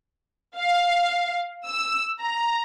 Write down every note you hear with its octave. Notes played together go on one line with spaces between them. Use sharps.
F5
E6
A#5